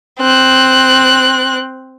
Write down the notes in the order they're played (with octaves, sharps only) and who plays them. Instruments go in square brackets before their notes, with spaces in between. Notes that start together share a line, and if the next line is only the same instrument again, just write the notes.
[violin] C4 F#6